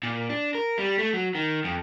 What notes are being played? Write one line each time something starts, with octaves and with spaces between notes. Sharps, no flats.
A#2
D4
A#4
G3
A3
F#3
D#3
F2